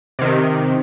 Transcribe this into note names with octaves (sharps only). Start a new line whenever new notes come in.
C3 D#3